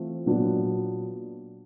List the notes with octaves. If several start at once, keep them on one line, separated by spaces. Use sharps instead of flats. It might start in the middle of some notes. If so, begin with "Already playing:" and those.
Already playing: E3 A3 C4 F4
A#2 F#3 B3 D4